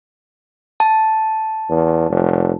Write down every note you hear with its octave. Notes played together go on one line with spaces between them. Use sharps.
A5
E2
F1